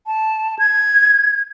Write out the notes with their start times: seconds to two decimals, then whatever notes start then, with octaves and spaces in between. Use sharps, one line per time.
0.07 A5
0.59 G#6